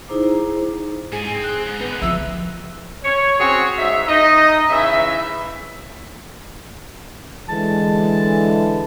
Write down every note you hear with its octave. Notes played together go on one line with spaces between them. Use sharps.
D#4 E4 G#4 C5 A#5 D6
G#2 G#4 G#5
C4
F#6
G#2
D3 B3 D#4
F3 F4 E5 E6
C#5
C4 C#4 F#4 G#4 C#5
G#2 E5
D#4 D#5
C#3 E3 E5
D3 E3 G#3 A5